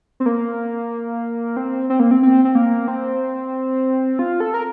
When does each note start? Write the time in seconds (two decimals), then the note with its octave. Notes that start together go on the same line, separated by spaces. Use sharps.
0.20 C4
0.26 A#3
1.57 C4
1.90 C4
2.00 A#3
2.11 C4
2.23 C4
2.45 C4
2.55 A#3
2.88 C4
4.19 F4
4.40 A4
4.54 A#4